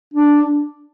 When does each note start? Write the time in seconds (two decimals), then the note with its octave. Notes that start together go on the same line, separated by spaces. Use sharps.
0.14 D4